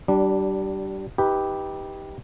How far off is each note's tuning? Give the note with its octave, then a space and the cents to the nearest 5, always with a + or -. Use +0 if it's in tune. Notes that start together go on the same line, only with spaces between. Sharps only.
G3 -30 D4 +0
D#4 +30 G4 +0 B4 +0